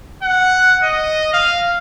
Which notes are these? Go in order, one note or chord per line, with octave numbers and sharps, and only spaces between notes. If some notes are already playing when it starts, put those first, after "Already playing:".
F#5
D#5
F5